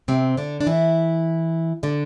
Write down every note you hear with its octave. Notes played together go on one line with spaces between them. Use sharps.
C3 C4
D3 D4
D4
E3 E4
D3 D4